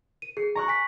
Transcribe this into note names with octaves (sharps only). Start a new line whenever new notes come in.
D#7
G#4 C7
A#5 C#6 F#6
G#5 B6